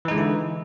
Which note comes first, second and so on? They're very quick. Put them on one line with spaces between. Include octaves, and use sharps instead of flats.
E3 D#4 G#3 D3 E4